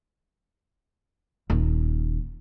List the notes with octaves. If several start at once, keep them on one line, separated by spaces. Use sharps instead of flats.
D#1